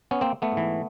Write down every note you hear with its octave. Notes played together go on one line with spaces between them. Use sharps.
B3 C#4
A#3 C4
A3 B3
G#2
E3